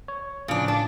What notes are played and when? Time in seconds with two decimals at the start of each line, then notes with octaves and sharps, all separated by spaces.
0.08 C#5
0.48 A2 C#3 F3 D4
0.68 D4